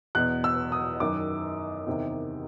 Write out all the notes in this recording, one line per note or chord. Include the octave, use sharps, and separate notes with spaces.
E2 B2 F#6
E6
D#6
F#2 D#3 D6
E2 C3 D#3